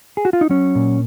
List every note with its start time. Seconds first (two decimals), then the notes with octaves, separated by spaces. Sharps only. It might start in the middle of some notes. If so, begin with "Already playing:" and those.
0.17 G#4
0.25 F#4
0.33 F4
0.41 D#4
0.49 F#3 C#4
0.75 A#2